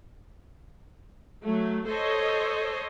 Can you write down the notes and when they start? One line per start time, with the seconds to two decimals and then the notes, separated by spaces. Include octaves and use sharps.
1.44 F#3 A3
1.87 A4 C5 C#5 D#5